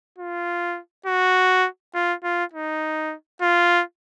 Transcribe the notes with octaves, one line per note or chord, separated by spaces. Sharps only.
F4
F#4
F4
F4
D#4
F4